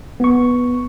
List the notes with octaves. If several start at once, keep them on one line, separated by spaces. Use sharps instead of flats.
B3 C#6